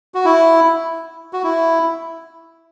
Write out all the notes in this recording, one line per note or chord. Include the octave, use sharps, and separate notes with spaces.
F#4
E4
F#4
E4